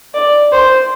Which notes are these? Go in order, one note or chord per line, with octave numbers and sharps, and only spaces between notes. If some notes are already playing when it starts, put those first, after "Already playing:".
D5
C5